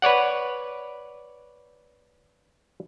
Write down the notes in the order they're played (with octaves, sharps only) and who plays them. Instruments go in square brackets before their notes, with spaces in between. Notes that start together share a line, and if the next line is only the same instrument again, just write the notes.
[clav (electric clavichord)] B4 C#5 D5 F#5